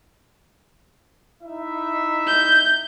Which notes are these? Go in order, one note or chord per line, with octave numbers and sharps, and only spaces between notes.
D#4 E4 E5
G6